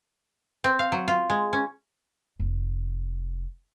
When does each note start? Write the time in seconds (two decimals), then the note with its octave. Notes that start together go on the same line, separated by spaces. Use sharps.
0.64 C4
0.79 F5
0.92 F#3
1.08 F4
1.30 G#3
1.53 C#4
2.40 F1